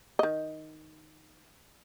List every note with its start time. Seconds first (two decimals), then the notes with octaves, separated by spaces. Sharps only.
0.19 D#3 D#5